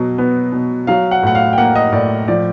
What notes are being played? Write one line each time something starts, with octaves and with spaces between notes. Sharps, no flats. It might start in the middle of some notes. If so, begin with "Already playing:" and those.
Already playing: B2 F#3
B3
B2
F#3 F5
F#5
A2 F#5
F5
G5
A#3 F#5
D#5
A2 D5
F3 D5